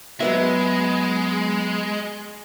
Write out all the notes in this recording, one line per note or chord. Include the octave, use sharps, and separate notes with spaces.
F#3 G#3 B3 E5